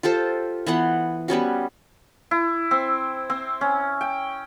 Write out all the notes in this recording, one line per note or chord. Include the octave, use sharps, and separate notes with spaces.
F4 G4 A4 C5
E3 B3 F#5 C6
G3 B3 C#4 F#4
E4
C4
C4
C#4
G5